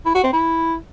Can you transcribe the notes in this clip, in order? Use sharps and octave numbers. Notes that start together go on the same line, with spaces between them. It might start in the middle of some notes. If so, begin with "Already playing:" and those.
E4
F#4
C4
E4